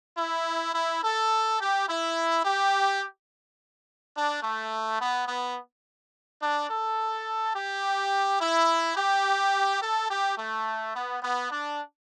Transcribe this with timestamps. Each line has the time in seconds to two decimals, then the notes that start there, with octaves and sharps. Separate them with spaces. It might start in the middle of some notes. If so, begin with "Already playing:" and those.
0.18 E4
0.74 E4
1.03 A4
1.60 G4
1.88 E4
2.44 G4
4.15 D4
4.43 A3
5.00 B3
5.28 B3
6.41 D4
6.69 A4
7.54 G4
8.40 E4
8.96 G4
9.81 A4
10.09 G4
10.37 A3
10.95 B3
11.22 B3
11.51 D4